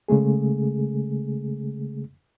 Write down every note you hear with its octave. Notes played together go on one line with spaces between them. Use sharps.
C#3 G#3 A3 G#4